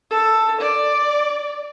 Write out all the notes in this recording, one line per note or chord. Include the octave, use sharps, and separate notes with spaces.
A4
D5